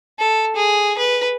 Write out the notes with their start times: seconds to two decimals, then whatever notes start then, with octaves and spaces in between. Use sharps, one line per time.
0.19 A4
0.56 G#4
0.98 B4